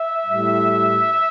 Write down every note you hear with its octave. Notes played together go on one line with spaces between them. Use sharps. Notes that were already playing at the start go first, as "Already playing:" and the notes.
Already playing: E5
A2 G3